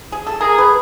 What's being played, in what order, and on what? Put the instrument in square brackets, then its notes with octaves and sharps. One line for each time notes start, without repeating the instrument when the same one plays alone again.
[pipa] G#4
A4
[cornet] G#4 [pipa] A#4
[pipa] B4